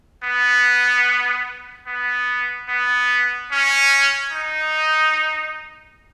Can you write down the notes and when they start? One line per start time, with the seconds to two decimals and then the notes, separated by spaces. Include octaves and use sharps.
0.24 B3
1.87 B3
2.69 B3
3.52 C#4
4.33 D#4